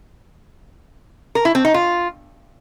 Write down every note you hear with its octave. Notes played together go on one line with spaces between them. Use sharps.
A#4
E4
C4
D#4
F4